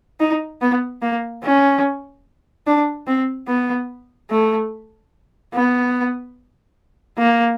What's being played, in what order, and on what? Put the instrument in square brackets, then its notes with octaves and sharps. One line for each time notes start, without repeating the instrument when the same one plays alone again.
[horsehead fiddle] D#4
B3
A#3
C#4
D4
C4
B3
A3
B3
A#3